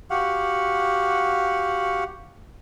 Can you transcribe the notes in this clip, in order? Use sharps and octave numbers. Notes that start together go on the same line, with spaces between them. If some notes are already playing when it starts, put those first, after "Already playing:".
F#4 G4 F5 F#5